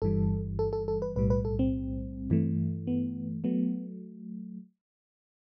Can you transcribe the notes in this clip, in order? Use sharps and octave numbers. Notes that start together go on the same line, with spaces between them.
G1 G2 E3 G3 A4
A4
A4
A4
B4
B1 A2 G3 B4
B4
A4
C4
G2 E3 A3
B3
F#3 A3 B3